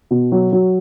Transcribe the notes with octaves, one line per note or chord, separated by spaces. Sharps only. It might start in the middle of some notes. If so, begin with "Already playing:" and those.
B2
F#3
F#3